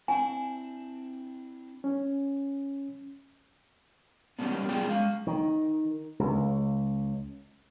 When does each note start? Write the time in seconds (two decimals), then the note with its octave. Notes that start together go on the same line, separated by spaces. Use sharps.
0.08 C4 D4 E4 G#5
1.84 C#4
4.39 G3 A#3 B3 C#4 D4
4.69 F#2 B3 F4 G#4 D5 G5
4.87 G#3 F5
5.27 D#3
6.19 C#2